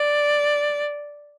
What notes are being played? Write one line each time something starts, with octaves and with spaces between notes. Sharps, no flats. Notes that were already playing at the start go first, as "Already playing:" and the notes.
Already playing: D5